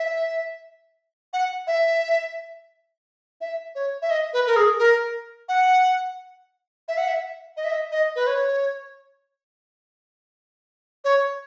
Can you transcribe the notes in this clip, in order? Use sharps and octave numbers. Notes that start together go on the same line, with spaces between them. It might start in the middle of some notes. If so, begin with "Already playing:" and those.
Already playing: E5
F#5
E5
E5
C#5
E5
D#5
B4
A#4
G#4
A#4
F#5
E5
F#5
E5
D#5
E5
D#5
D#5
B4
C#5
C#5